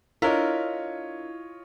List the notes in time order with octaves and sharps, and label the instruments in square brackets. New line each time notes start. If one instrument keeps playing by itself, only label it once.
[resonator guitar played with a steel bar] D4 A#4 [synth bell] E4 [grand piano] F4 C#5 D#5